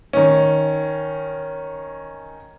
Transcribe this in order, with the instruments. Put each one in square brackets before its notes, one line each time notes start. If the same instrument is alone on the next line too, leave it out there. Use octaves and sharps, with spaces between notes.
[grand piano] D#3 C#4